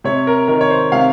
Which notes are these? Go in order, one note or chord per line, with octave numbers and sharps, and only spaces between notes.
C3 C#5
A#4
D#3 A#4
C#5
C5
C3 F5